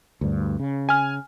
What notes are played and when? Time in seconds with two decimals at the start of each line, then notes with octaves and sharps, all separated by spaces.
0.21 D2 G2
0.60 C#3
0.89 G#5 F6